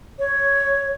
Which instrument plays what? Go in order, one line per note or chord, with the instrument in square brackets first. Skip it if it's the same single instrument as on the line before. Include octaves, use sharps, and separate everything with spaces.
[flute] C#5